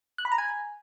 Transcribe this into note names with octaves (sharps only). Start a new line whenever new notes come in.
F#6
B5
A#5
G#5